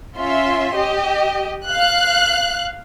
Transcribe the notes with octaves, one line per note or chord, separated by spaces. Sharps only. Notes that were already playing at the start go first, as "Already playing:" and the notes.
C#4 F4 E5 C6
G4 D#5
F5 F#6